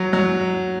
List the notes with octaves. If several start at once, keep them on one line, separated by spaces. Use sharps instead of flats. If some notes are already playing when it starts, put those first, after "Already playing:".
Already playing: F#3
F#3